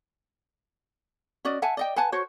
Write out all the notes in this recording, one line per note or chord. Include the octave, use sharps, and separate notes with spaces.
C#4 F#4 D5 D#5
E5 F#5 G#5 A5
D5 D#5 G5
B4 F#5 G#5 A5
F#4 C5 C#5